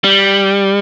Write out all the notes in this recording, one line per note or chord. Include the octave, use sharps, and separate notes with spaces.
G3